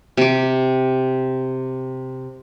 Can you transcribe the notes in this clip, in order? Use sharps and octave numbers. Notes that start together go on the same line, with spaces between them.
C3 G4